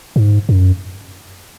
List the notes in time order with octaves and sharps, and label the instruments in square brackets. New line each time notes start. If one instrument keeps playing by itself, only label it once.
[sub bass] G#2
F#2